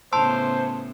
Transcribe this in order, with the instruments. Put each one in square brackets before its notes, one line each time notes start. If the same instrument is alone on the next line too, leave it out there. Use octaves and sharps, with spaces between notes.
[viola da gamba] A2 C#3 B3 [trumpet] C5 [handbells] A5 C6 E6